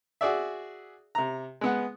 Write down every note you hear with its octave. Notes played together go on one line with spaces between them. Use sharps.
F#4 G#4 D5 E5
C3 A#5
G#3 B3 F#5